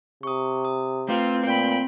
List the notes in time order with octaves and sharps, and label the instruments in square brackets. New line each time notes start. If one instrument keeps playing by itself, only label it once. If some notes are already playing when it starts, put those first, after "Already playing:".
[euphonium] C3 [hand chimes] C#6 D#6
[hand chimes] D#6
[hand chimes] A3 B4 [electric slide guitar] C4 [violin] F4
[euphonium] A#2 [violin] G5 B5